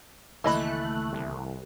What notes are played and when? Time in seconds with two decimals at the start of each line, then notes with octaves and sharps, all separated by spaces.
0.44 C#2 D#3 E3 A3 A#3 D#5 B5 F#6
1.12 C2